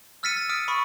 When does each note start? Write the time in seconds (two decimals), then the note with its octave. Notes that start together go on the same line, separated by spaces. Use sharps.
0.23 E6 F6 A6 B6 C#7 D#7
0.37 A6
0.49 D#6 F6 D7
0.68 B5 C#6 D#6